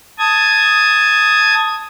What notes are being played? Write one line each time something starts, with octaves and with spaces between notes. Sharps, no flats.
A5 D#6 G#6